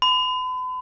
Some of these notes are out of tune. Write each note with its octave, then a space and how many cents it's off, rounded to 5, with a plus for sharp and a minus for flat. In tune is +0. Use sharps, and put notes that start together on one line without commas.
B5 +40